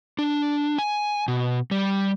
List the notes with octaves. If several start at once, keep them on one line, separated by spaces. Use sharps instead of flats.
D4
G#5
B2
G3